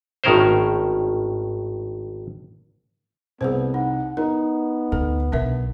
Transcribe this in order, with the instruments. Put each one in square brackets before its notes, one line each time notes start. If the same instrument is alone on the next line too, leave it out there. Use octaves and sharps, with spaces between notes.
[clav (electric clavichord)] G#1 A2 D#3 C#4 A#4 C5
[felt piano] C2 [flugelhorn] B3 [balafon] G#4 B4 C5
[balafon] D#4 [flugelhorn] F#5
[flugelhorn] B3 [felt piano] D#4 [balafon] A#4
[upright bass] D2 [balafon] A4
[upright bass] B1 [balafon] D4 A#4 E5